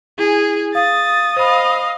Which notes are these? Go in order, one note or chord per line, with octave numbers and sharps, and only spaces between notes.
E4 G#4 G#5
F5 D#6 A6
C5 D#5 F5 B5